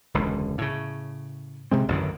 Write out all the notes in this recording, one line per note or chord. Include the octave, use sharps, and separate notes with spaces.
E1 C#2 D3
A2 C#3
C3 G#3 C4
A1 F#2 D3 D#3